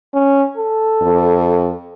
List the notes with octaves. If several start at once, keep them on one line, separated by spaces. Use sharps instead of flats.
C#4
A4
F2